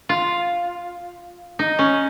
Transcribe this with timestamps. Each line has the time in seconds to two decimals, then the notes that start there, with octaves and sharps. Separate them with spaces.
0.09 F4
1.59 D#4
1.79 C#4